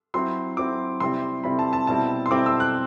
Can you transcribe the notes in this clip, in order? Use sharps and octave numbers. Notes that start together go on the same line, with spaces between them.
F#3 C4 E4 C6
F#3 C4 E4 D6
C3 G3 C4 E4 C6
C3 G3 C4 E4 B5
A5
A5
B2 G3 C4 E4 A5
C6
B2 G3 C4 E4 D6
E6
F#6